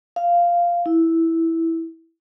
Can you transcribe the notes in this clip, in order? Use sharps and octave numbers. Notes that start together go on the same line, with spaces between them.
F5
E4